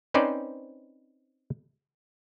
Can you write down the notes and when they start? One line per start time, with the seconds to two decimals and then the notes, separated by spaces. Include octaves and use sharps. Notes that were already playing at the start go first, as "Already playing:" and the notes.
0.14 C4 C#4 D#4 B4 C5 D5